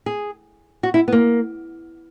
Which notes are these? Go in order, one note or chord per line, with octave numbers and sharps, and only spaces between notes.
G#4
F#4
E4
B3
A#3